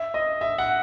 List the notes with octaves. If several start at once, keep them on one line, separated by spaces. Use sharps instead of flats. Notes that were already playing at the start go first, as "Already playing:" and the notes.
Already playing: E5
D#5
E5
F#5